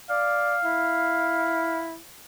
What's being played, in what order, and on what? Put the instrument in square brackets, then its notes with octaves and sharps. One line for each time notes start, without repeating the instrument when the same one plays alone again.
[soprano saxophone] D5 [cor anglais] F5
[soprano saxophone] E4